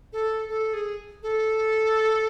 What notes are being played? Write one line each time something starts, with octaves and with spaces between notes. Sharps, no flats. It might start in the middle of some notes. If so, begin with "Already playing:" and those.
A4
A4
G#4
A4